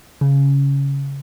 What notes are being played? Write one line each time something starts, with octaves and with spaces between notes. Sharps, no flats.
C#3